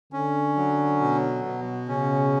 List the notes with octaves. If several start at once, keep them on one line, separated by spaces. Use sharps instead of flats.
D3 C#4
F#3
B2
B2
C#3 C#4